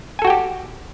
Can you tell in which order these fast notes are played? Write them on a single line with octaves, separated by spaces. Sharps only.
G#5 A4 F#4 G5 G4